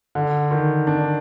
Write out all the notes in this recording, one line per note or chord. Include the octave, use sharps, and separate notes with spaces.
D3
D#3
D4